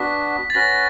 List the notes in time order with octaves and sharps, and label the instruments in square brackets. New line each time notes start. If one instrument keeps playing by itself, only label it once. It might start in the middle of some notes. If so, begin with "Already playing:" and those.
Already playing: [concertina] B3 D4 F#4 [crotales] B6
[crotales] A6
[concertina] C#4 F#4 B4 [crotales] A#6